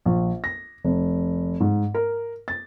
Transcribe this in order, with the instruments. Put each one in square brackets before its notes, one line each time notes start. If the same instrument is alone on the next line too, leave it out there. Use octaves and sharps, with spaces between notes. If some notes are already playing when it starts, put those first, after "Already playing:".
[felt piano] A#1
A#6
F1
G#2
A#4
A6